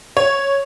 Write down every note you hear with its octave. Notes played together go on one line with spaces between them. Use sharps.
C#5